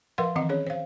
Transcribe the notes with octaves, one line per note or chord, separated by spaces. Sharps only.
F3 A#4 B4 F5 F#5 C6
D#3 E3 C4 D#5 F#5
C#4 G#4 C#5
C5 F5